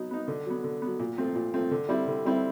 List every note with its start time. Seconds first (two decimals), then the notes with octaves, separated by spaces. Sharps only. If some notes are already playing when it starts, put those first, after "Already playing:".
Already playing: F#3 B3 D#4
0.11 B3 D#4
0.28 D3
0.46 F#3 B3
0.64 D3
0.82 B3
0.87 F#3
0.99 A#2
1.18 F3 A3 C4
1.35 A#2
1.54 F3 A3 C4
1.71 D3
1.89 G3 C4 E4
2.08 D3
2.25 G3 C4 E4